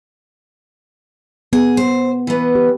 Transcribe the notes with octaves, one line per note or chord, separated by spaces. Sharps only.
B3 G#4
C5
E3 B3
G4